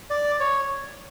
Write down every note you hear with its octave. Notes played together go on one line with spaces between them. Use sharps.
D5
C#5